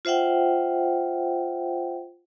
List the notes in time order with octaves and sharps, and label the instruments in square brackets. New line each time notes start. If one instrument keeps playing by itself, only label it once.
[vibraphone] F4 C5 E5 F#5 G5